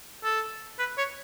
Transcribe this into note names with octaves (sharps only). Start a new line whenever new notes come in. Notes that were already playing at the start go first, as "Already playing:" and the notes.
A4
B4
C#5